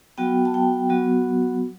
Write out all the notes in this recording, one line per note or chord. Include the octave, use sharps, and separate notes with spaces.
F#3 B3 F#4 G5
A5
G5
F#3 B3 F#4